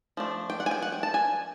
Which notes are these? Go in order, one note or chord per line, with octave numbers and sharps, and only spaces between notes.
F3 A3 D4
G5
F#5
G#5
G5
F#5
G5
A5
G#5